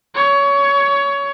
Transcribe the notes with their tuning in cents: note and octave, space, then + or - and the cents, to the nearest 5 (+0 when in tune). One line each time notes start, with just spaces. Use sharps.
C#5 +20